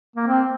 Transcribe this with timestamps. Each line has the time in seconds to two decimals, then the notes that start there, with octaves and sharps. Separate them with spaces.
0.16 A#3
0.28 C4